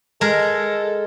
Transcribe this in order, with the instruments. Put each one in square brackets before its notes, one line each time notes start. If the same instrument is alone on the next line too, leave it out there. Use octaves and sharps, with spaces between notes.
[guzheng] G#3 A#4 [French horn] A4